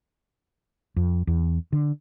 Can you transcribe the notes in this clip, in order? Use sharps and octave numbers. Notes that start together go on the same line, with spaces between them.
F2
E2
D3